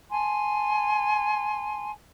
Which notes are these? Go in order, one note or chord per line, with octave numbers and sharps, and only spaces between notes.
G#5 A5 C6